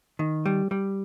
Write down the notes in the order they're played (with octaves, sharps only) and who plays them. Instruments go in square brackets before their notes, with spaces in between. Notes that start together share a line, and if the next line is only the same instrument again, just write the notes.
[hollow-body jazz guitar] D#3
G3
G3